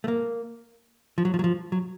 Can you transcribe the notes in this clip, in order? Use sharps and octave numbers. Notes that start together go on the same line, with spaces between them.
A3
A#3
F3
F#3
F3
F#3
F3
F#3